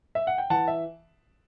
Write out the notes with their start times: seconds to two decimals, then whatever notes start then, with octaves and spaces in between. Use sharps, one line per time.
0.15 E5
0.27 F#5
0.38 G5
0.50 E3 F#5 A5
0.68 E5